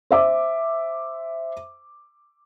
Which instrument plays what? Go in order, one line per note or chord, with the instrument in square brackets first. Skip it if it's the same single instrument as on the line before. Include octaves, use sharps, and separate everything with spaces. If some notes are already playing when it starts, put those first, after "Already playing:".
[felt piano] C5 E5 D6